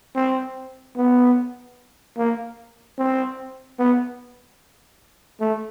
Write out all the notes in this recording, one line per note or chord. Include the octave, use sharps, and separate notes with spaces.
C4
B3
A#3
C4
B3
A3